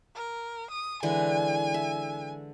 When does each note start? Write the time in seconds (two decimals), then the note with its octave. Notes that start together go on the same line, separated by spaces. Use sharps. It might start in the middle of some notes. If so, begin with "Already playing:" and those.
0.15 A#4
0.71 D#6
1.03 D3 E3 G#3 G#5
1.74 E5